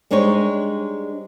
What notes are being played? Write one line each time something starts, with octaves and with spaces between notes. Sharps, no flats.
G3 G#3 D4 D#4 C5 C#5